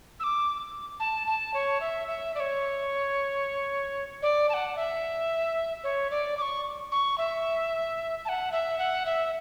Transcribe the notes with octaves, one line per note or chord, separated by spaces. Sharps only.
E6
D6
A5
A5
C#5
E5
E5
D5
C#5
D5
A5
F#5
E5
C#5
D5
D6
C#6
C#6
E5
A5
F#5
E5
F#5
E5